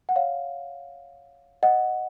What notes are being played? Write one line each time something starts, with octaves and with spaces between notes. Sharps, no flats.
F#5
C#5 F5
D#5 F#5